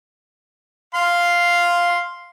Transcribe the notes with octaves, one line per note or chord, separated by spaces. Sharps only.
F5 C6